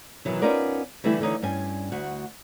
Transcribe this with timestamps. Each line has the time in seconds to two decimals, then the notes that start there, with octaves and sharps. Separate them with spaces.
0.25 B2 D#3 E3 F#3 E4
0.42 B3 C#4 D#4 F4 A#4 D5
1.04 D3 E3 G3 A3 E4
1.20 D3 E3 D#4 C#5
1.42 G2 C#4 G#5
1.92 D2 F#4